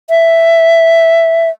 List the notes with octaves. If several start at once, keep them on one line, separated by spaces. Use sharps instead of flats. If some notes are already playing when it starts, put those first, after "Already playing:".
E5